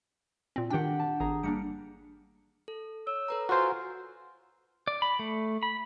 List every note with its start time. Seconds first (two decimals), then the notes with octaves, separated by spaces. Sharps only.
0.56 A#2 C4
0.70 D#3 D4 G4 F#5 G5
0.99 A5
1.20 G#1 G#4 A#5
1.43 G3 A#3 D4 C#7
2.68 A4
3.07 C#5 E6
3.28 A4 B4 A#5
3.49 F4 F#4 C5 F#5 G#5 A#5
4.88 D5
5.02 B5
5.19 A3
5.63 B5